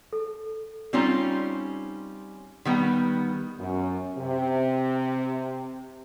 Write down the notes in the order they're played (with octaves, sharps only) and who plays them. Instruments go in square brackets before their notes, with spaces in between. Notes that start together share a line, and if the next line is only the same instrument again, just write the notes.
[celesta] A4
[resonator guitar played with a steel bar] G3 C4 C#4 D#4 F4
D#3 G3 B3
[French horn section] F#2
C3